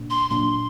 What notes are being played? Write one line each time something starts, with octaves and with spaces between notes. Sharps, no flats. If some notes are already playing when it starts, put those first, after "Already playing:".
Already playing: A#2 A#3 D4
C6
A#2 F#3 A#3 D4 C6